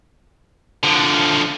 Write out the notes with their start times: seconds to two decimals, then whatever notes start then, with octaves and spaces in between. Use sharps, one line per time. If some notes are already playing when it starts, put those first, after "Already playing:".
0.83 D3 F3